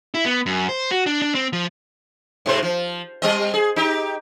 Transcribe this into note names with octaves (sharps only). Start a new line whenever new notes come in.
E4
B3
F#2
C5
F#4
D4
D4
C4
F3
G#2 C3 C5
F3
G3 C4 D#5
G#4
D#4 G4